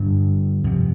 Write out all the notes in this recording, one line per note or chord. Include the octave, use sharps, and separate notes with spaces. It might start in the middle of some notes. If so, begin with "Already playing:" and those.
Already playing: G2 D3
F2 C3